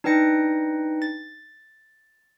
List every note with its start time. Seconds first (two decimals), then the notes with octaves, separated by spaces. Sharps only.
0.04 D4 D#4 B4 G5 A#6 C#7
1.02 A6